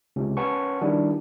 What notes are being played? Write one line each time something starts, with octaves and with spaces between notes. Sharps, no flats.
C#2 C3 C#4
C#4 B4 C#5 F#5 A5 C#6
D#3 G3 D4 E4 F#4